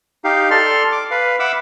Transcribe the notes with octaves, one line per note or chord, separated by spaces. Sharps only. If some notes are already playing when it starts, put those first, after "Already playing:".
D#4 G4 F5
A4 D5 C6 F6
D6
B4 F5
E5 F#5 B5 D6 E6